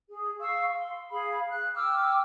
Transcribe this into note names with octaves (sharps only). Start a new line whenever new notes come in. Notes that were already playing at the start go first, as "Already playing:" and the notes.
G#4
F5 C#6 E6
C6
G#4 F5 B5
F#6
G5 D6 E6 F6